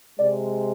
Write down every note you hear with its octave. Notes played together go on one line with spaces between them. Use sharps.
C3 G#3 D5